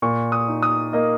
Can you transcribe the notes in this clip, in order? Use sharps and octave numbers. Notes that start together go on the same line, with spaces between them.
A#2 C#6
D#6
D#4
D#6
A#3 D#5